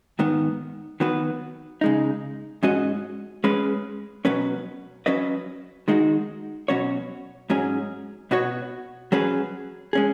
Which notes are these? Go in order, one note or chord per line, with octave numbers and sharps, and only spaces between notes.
G#2 D#3 B3
D#3 F#3 B3 F#4 B4
C#3 G#3 D#4
G#2 G#3 C#4 F#4 D#5
G#3 C#4 B4
B2 F#3 C#4 B4
F#3 C#4 B4 D#5
D#3 G#3 D#4 F#4
B2 F#3 C#4 F#4 C#5
G#2 F#3 C#4 G#4
B2 B3 F#4 C#5
F#3 C#4 G#4 B4
G#3 C#4 G#4